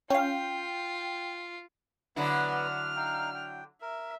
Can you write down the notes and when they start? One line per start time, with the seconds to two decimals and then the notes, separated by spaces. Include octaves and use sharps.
0.10 C#4 F4 F5 G5
2.16 D3 F#3 B3 E4 B4
2.55 F6
2.96 D#4 F5 G5
3.35 G5
3.82 A#4 E5